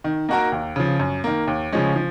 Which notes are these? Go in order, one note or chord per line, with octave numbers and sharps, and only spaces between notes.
D#3
A#3 D#4 F#4 A#4
D#2
C#3 F3
F#2
D#3 A#3
D#2
C#3 F3 G#3 C#4
F3